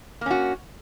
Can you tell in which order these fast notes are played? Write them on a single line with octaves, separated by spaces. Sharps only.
A#3 C#4 F#4